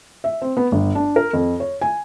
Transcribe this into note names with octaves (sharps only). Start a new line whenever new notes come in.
E5
C4
B3
G1
D4
A#4
F2
C#5
G#5